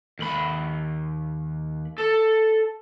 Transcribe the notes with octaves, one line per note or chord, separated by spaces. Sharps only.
D#2 B5
A4